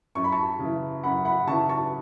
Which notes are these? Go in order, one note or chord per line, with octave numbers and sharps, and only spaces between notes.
F#2 C#6
B5
A5 C#6
C#3 E3
F#2 F#5 B5
F#5 B5
C#3 E3 A5 C#6
A5 C#6